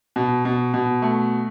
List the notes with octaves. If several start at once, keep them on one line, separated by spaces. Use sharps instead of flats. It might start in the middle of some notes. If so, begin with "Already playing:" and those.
B2
B2
B2
A3